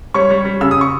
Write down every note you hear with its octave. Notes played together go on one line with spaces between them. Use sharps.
G3 C#5 C#6
G3
G3
C#3 E6
D#6
C#6